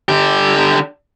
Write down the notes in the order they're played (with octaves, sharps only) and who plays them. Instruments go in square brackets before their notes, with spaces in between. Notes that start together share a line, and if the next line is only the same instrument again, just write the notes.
[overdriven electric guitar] D3 G4